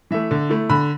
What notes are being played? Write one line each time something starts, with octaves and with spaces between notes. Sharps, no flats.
E3 A3 E5
D3
A3 E4
D3 B5